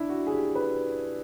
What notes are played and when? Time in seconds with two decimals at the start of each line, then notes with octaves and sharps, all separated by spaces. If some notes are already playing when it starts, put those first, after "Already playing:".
Already playing: D4 E4
0.09 F#4
0.27 G#4
0.32 G4
0.55 B4